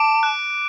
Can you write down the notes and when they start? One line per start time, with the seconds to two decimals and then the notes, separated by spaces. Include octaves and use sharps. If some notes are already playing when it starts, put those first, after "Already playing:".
Already playing: A5 D6 D7
0.23 F#6